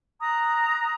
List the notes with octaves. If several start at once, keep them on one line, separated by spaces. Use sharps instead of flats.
A#5 D#6 F#6